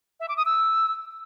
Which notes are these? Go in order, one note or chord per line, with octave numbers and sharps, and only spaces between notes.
E5
D6
D#6
E6